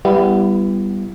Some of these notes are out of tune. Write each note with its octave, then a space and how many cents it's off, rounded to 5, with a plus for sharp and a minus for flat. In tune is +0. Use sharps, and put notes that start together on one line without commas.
G3 +0 B3 +0 E4 +35